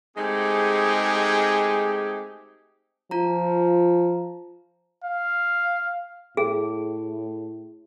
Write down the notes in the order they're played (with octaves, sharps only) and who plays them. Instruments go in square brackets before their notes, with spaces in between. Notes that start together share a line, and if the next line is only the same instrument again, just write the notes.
[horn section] G#3 A3 C4 D#4 G4 G#4
[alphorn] F3 [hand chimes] F4 A#5
[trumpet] F5
[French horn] A2 [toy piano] G#4